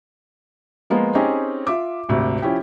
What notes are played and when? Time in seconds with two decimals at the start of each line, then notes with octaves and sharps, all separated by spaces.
0.90 F3 G#3 A#3 B3 F4
1.15 C4 C#4 D#4 G4 G#4
1.67 F4 E5 D6
2.09 G#1 D2 C3
2.42 F3 C#4 E4 G4